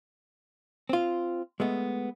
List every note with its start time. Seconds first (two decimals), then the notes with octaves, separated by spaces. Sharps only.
0.89 C4 F4
1.60 G#3 A3 B3